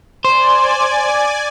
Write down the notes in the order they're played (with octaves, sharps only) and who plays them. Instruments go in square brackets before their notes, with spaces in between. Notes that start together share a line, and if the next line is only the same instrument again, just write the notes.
[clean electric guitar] C5 [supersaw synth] D5 G#5